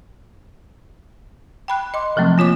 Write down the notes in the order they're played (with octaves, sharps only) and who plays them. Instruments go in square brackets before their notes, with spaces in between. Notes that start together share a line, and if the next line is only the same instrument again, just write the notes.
[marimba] G5 B5 F#6
D#5 C6 D6
C3 F3 F#3 A3 C4
A#3 F4 C#5 D6